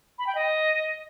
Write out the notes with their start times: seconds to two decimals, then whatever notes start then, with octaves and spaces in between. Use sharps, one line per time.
0.18 B5
0.27 G5
0.35 D#5